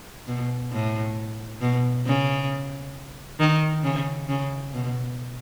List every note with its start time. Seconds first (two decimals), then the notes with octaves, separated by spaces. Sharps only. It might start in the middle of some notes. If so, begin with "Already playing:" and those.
0.27 B2
0.72 A2
1.61 B2
2.06 C#3
3.40 D#3
3.83 C#3
4.29 C#3
4.74 B2